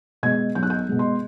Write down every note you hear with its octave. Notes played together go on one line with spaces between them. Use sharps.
B2 G#3 G#6
B1 G6
F#6
G6
B2 G#3
C6